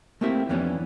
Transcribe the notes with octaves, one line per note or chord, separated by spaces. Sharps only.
A3 A#3 C4 E4 G4 E5
F2 E3 B3 C#4 D4